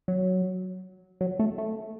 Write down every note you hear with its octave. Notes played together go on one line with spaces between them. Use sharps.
F#3
F#3
A3
A3